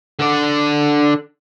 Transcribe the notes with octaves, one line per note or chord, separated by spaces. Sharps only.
D3 D5